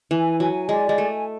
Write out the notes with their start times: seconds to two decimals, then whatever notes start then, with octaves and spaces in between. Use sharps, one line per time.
0.11 E3 G#5
0.40 F#3 G#5
0.69 G#3 D5
0.89 G#3
0.98 A3 G#5